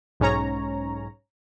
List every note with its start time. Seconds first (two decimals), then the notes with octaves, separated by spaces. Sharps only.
0.20 B1 G#2 C#4 C#5 A#5